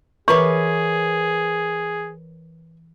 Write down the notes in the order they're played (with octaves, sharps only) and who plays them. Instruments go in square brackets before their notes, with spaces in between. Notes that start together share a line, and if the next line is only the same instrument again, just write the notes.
[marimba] E3 D6 [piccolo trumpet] G#4 [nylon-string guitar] A#4 B4 C#5 [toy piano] A#5 C#6